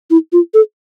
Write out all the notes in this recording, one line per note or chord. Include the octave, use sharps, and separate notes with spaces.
E4
F4
A4